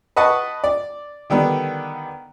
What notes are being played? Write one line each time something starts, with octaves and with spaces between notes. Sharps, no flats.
B4 D#5 F#5 A5 C#6
D5
D3 D#3 G3 B3